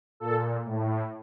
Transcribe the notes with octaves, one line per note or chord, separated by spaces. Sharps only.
A#2 A4
A2